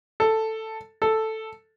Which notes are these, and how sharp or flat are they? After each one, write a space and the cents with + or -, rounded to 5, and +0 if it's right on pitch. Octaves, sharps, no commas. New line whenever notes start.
A4 +5
A4 +0